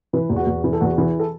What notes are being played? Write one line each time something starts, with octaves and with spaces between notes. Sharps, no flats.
E3 B4
E2
F#4
E2
E3
A4
E2 F#4
E3
A4